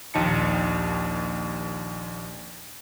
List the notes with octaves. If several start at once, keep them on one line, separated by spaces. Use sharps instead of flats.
A#1 D#2 D#4 A5 C#7